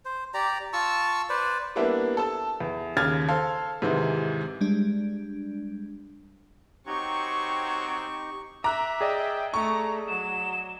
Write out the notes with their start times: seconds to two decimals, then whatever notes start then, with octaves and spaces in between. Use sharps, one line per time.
0.05 C5
0.34 G4 D5 A#5
0.73 F4 A5 C#6 E6
1.30 B4 C5 D5
1.76 G3 A#3 B3 D4 E4
2.17 A4 A5
2.60 E2
2.97 D#2 C#3 F6 G#6 A6
3.28 A4 C5 F5
3.82 G#2 C3 D#3 E3
4.61 G3 G#3 D4
6.87 F#3 C4 D#4 G4 C#6
8.64 E5 A#5 D6 F#6
9.01 G#4 D5 D#5 G5
9.54 A3 A#5 C#6
10.08 F#3 E7